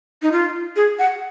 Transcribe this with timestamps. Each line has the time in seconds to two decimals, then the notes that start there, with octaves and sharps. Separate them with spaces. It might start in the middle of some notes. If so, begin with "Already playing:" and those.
0.22 D#4
0.32 F4
0.76 G#4
0.99 F#5